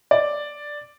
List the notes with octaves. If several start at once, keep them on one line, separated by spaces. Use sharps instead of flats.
D5